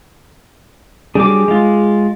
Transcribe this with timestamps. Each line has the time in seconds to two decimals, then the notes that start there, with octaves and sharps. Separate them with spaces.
1.15 F#3 G3 D4 G#4 D6
1.48 G#3 F4